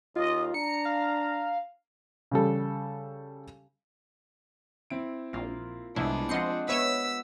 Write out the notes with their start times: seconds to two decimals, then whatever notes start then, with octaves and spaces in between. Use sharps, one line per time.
0.16 D#2 F4 D#5
0.54 D4 A#5 C#7
0.85 F5
2.31 C#3 G3 A4
4.90 C4 E4 D7
5.33 A#1 A#3 F4
5.96 C2 G#3 B3 D4 E4
6.29 F3 C4 C5 D#5 F#5 C6 C#7
6.69 B3 B4 C#5 E5 E6 B6